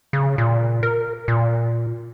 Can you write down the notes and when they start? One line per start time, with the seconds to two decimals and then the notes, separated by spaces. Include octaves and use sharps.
0.13 C#3
0.38 A#2
0.83 A#4
1.28 A#2